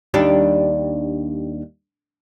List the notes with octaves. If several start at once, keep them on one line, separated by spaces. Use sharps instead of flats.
D#2 G3 D4